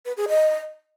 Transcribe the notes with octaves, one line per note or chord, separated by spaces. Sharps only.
B4
G#4
D#5